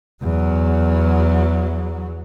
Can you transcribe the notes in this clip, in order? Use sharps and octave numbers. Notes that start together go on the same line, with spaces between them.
E2 F#3